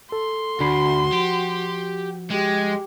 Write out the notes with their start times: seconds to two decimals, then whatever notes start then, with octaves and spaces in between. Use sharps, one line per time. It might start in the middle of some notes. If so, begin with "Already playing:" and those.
0.12 A4 C6
0.60 D2 D4 F#4 B5 C7
1.12 F3 G4
2.31 G#3 G4